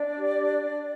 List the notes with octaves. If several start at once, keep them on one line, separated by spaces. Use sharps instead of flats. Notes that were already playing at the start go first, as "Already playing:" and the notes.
Already playing: D4 D5
G4
D4
D4